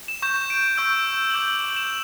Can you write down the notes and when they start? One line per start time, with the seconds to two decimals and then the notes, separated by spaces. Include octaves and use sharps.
0.08 E7
0.22 C#6 G6 E7
0.50 D7
0.77 C#6 E6 G6
1.30 F#7
1.34 D6 G6 E7
1.48 F#7
1.70 F#7
1.76 E7